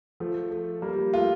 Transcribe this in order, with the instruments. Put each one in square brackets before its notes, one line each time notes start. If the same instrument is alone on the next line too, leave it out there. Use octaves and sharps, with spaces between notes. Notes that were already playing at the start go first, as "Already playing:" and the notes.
[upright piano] F3 [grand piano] A3
[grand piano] A3
[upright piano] G3 [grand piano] A#3
[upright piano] G3
[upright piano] A3 [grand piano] F4